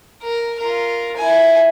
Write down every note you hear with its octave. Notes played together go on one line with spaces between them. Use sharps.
A#4
F4 A#4
E4 G#5